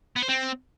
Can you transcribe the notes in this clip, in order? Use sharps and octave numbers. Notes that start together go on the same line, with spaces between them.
B3
C5
C4